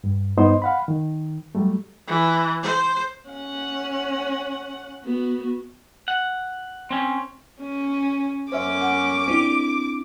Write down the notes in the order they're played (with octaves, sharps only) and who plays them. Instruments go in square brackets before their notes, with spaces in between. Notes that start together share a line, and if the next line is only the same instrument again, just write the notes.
[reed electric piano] G2
G2 B3 D#4 C5 D#5 C6
F5 F#5 B5
D#3
F#3 G3 A3
[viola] E3
C5
C#4 F#5
B3 F#4
[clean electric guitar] F#5
C4 C#4
[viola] C#4
[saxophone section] F#2 C#4 [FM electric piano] C5 E5 [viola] D6
[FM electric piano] F#5
C4 D4 E4